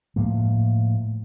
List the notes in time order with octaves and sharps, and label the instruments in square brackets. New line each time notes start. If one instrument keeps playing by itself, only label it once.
[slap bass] A2 F3 A#3